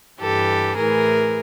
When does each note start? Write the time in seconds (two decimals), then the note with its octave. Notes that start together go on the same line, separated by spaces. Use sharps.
0.21 G2 E3 G4 A4
0.77 A2 E3 G#4 A#4